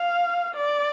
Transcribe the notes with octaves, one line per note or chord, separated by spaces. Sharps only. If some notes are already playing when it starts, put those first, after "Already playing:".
Already playing: F5
D5